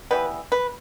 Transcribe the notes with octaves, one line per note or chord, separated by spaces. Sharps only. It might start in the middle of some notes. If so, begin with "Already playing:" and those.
E3 G3 B3 B4
B4